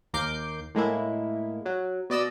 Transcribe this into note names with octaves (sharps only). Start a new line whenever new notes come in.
D#2 A#4 D6 G6 C7
A2 G#3 A#3 E4
F#3
B2 D5 D#5 E6